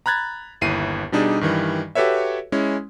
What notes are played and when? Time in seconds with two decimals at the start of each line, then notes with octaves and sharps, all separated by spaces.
0.06 A#5 B5 F#6 G#6 A6
0.61 G1 D#2 E4 C7 D#7
1.12 B2 G3 D4 D#4 G#4 D5
1.41 G2 D#3 E3 G3
1.95 F#4 G4 A4 B4 C#5 E5
2.52 G#3 C#4 E4